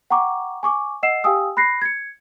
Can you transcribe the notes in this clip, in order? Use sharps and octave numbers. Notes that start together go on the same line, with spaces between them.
F#5 G5 A#5 C#6 D6
G#5 C#6 D6
D#5 F#5 E6 C7 E7
G4 F5 G5 G#5 D#6 E6
B5 F#6 A#6 C7
G#6 C#7